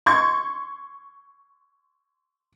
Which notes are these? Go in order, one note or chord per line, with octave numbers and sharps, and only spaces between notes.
C6 C#6 G#6